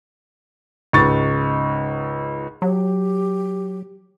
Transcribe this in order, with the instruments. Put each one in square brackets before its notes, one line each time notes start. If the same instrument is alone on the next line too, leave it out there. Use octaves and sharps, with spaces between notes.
[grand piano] C#2 G#2 C#6 A6
[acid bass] F#3 [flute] G4